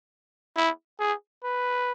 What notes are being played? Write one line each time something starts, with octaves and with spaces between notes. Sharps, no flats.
E4
G#4
B4